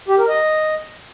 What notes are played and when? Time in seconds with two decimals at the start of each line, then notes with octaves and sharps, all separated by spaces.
0.08 G4
0.18 A#4
0.28 D#5